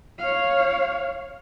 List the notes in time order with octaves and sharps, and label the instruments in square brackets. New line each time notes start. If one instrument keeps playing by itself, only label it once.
[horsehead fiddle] C#5 F5